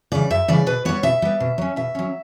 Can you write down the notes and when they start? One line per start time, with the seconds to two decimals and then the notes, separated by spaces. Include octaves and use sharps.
0.12 C#3 E3 G3 D5
0.30 F#2 E5
0.48 C#3 E3 G3 D5
0.66 B2 B4
0.85 G3 B3 C#5
1.03 B2 E5
1.22 G3 B3
1.40 B2
1.58 F#3 C#4
1.76 B2 E5
1.95 F#3 C#4